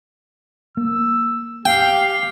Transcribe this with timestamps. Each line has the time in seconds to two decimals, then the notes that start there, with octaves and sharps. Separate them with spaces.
0.77 A#3 E6
1.65 G4 F5 G5